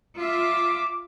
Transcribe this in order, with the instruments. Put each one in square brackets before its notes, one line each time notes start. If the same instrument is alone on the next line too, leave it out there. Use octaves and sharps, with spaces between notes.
[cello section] F4 E5 [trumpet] D6